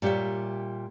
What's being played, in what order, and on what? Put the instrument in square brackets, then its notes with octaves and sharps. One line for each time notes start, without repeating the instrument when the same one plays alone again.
[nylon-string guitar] A#2 G3 G4 C#5 E5